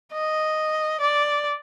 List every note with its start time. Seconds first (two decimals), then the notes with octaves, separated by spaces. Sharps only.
0.13 D#5
1.01 D5